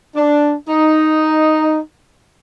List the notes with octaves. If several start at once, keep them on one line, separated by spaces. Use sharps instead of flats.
D4
D#4